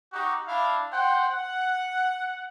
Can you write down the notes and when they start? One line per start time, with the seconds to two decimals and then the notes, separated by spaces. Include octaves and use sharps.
0.13 D#4 F#4 G4
0.48 D4 E4 F5
0.92 C5 F#5 G5
1.29 F#5